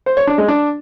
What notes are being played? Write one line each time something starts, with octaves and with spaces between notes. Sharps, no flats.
C5
C#5
D4
G#3
D4